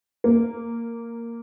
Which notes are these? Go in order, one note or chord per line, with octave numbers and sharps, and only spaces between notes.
A#3